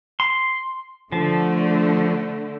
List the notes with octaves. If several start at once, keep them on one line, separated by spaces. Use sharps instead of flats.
C6
D3 F3 A3